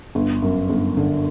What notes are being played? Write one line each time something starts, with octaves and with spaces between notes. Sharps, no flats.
G1
F#2
G1
D3